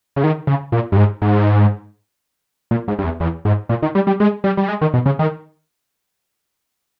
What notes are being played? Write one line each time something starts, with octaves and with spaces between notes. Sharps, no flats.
C#3
D#3
C#3
A#2
G2
G#2
G#2
A#2
G#2
G2
E2
E2
G#2
A#2
D#3
G3
G3
G#3
G3
G3
G#3
D#3
B2
C#3
D#3